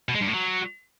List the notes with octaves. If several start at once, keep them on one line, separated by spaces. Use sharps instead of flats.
B2
G#3
G2
A2
F#3